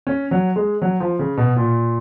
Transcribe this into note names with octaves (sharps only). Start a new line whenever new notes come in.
C#4
F#3
G#3
F#3
F3
C#3
B2
A#2